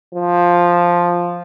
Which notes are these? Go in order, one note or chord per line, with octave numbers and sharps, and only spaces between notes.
F3